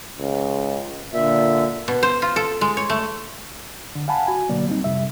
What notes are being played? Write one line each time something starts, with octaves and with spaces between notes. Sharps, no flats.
C#2
A#2 D3 E5
B2
C5
F4
A4
G#3
C#5
A3
D3
F5 F#5 G#5 A5 B5
F#4 G#5
B2 D3 F#3 A#3 D5
G3 C4 D#4
F2 C3 G3 E5